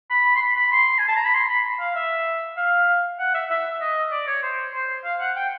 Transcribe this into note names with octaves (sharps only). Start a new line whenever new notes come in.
B5
C6
B5
B5
C6
G#5
A5
A#5
B5
C6
B5
F5
E5
F5
F#5
E5
E5
D#5
D5
C#5
C5
C5
F5
F#5
G5